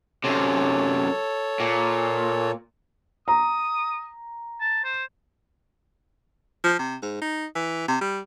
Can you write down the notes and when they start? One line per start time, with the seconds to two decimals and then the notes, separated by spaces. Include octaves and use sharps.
0.24 F#2 C3 A4 C#5
1.60 A#2
3.28 A#5 D#6
4.61 A5
4.84 C5
6.64 F3
6.79 C3
7.02 G#2
7.22 D#4
7.55 E3
7.88 C3
8.01 G3